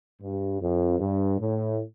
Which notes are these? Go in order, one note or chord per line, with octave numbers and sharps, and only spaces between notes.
G2
F2
G2
A2